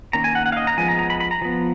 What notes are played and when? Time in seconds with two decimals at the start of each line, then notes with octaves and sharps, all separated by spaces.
0.13 D#3 A#3 C#4 A#5
0.24 G#5
0.35 F#5
0.46 F#5
0.52 F5
0.57 D#5
0.67 A#5
0.77 F3 G#3 B3 G#5
0.88 A#5
0.99 A#5
1.10 B5
1.20 B5
1.31 A#5
1.42 F3 B3